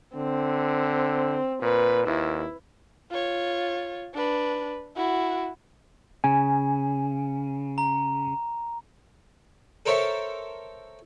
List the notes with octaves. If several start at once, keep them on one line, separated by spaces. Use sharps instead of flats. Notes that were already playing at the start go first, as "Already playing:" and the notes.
D3 C4
A#2 B4
D#2 E4
F4 C#5
D4 B4
E4 F#4
C#3 G#5
A#5
A4 A#4 C5 C#5 E5 A5